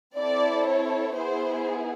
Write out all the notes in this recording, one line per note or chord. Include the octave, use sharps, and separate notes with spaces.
C4 E4 A4 D5
C#5
B3 E4 G#4 C5